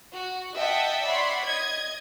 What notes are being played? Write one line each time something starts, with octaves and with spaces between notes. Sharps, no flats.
F#4
D#5 E5 F#5 G5 A5
C#5 D5 E5 F#5 B5 C6
D#5 G#6